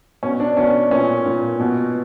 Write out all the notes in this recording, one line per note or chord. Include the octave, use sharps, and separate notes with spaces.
B2 C#4
D4
B2 C#4
A#2 C#4
A#2
B2